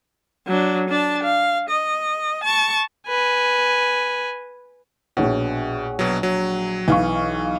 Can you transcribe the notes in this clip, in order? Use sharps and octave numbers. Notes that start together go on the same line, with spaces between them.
F#3 D4
D4 A5
F5
D#5
A5 C#6
B4 G#5
A#1 B2 C#5 F#5
B2 F#3
F#3
B1 E3 F5 C#6